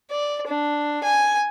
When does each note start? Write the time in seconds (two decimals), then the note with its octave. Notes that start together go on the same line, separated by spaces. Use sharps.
0.11 D5
0.47 D4
1.03 G#5